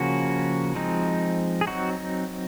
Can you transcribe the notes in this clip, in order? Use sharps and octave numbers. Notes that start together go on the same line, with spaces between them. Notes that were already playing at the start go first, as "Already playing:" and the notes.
Already playing: C#3 F3 A#3 C#4 F#4
F3 G#3 C4 D#4
G#4
F#3 C4 D#4 F#4